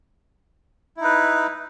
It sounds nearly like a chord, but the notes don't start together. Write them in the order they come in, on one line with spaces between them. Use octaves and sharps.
E4 D#4 B4